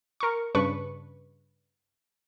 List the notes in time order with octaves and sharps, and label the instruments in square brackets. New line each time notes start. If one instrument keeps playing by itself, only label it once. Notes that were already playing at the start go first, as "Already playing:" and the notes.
[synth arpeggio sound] A#4 C#6
G2 C#3 D4 B4 C#6